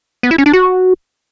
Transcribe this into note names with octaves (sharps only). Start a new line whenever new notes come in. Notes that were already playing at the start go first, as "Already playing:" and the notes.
B3
E4
C#4
D4
F#4